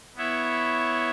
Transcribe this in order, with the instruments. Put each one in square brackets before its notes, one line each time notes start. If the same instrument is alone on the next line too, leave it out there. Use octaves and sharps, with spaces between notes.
[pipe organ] B3 E4 C#5 E5